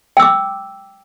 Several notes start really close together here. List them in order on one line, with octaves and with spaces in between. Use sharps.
G5 E6 D6